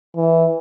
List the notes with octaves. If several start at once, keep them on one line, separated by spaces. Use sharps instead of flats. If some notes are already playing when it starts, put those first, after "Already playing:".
E3